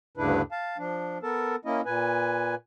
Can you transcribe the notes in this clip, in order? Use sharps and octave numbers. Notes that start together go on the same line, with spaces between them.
D2 G2 C#3 D4 E4 B4
F5 A5
F3 D4
B3 A4 A#4 A5
A#3 C#4 E4 D#5
A#2 B4 G#5